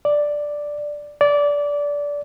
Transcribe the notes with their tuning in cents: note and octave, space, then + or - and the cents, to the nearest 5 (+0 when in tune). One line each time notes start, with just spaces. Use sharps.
D5 +0
D5 -20